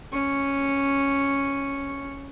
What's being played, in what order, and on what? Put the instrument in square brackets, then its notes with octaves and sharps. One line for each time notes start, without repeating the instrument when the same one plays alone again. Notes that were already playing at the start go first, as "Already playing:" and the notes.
[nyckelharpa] C#4 C#6